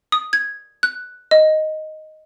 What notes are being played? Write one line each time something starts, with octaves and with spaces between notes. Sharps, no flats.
D#6
G#6
F#6
D#5